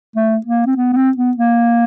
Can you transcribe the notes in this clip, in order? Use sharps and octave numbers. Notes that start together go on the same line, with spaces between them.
A3
A#3
C4
B3
B3
C4
B3
A#3